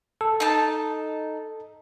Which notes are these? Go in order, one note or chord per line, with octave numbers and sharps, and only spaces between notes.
A4
D#4 A5